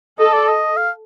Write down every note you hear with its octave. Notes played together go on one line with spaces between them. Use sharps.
A4 D#5
D5
D#5
F5